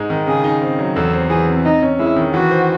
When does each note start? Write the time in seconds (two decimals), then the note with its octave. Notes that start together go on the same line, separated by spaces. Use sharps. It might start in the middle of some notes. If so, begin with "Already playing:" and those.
Already playing: G#2 G#3 D#4
0.10 D#3
0.27 C#3 G#4
0.44 D#4
0.62 C4
0.79 F#3
0.95 E2 A4
1.13 C4
1.30 E3 G#4
1.48 C3
1.65 C3 D#4
1.82 C#4
1.99 G#3 E4
2.16 D#3
2.34 E3 F#4
2.51 C5